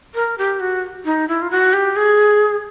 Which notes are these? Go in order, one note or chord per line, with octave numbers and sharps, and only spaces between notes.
A#4
G4
F#4
D#4
E4
F4
F#4
G4
G#4